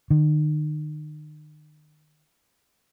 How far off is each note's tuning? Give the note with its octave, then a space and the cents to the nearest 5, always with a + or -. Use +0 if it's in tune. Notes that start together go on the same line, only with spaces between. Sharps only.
D#3 -40